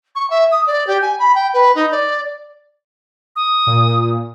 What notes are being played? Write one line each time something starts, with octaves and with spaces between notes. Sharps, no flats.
C#6
E5
D#6
D5
G4
G#5
B5
G5
B4
D#4
D5
D#6
A#2